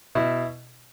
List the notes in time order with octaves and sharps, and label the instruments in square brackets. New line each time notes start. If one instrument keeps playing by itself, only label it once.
[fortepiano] B2 E4